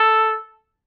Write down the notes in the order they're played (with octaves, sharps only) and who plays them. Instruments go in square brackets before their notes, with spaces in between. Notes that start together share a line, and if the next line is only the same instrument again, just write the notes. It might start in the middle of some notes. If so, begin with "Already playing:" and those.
Already playing: [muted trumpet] A4